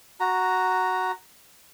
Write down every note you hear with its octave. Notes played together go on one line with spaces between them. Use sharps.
F#4 A#5